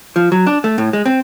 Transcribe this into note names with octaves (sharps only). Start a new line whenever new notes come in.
F3
F#3
D4
A3
A2
G#3
C4